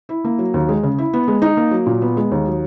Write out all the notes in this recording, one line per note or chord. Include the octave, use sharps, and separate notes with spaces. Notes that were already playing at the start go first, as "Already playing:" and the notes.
E4
A#3
F#3
D#2
G#3
C#3
E4
B3
G#3
D#4
A#3
F#3
A#2
B3
G#3
D#2
F#3